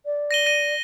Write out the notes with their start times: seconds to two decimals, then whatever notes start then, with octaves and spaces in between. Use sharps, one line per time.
0.06 D5
0.31 A#6 D#7 G7
0.46 A#6 D#7